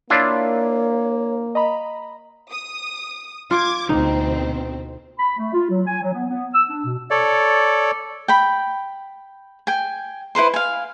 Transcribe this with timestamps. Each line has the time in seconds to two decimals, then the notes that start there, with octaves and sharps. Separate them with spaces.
0.10 A#3 D4 E4 F4 C#5
1.55 D#5 A#5 B5
2.51 D#6
3.51 F4 D6 G#6
3.89 D2 B2 C4 D#4
5.19 B5
5.38 A3
5.54 F4
5.70 F#3
5.87 G#5
6.02 F#3
6.13 B3
6.29 B3
6.54 E6
6.70 D4
6.86 B2
7.11 A4 C#5 D5
8.28 G5 B5
9.67 G5 G#5
10.35 E4 B4 C5 C6
10.54 F5 G#5